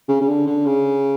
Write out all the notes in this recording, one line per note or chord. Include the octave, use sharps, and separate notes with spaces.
C#3
C#3
D3
D3
C#3